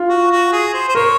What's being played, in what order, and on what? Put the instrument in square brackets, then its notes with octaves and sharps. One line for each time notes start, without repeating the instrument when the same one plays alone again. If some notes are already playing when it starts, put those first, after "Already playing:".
Already playing: [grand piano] F4
[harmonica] F#4
F#4
G#4
C5
C5
[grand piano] A#4 [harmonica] C#5